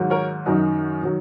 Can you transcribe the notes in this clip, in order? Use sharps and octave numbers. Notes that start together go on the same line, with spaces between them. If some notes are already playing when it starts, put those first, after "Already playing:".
Already playing: G#2 D#3 F#3
A#4 C#5
F#2 D#3 F#3 D#4 F#4
D#3 F#3